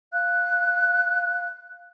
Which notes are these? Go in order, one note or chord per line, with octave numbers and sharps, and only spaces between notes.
F5 F#6